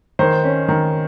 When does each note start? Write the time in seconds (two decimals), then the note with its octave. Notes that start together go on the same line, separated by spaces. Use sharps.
0.19 D#3 C5
0.44 C#4
0.68 D#3